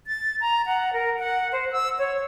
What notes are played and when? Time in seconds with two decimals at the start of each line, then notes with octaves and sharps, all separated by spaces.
0.07 A6
0.41 A#5
0.66 F#5
0.93 A#4
1.19 F#5
1.52 C5
1.72 E6
1.99 C#5